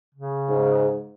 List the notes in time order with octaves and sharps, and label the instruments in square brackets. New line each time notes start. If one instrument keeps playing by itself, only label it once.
[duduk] C#3
[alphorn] G#2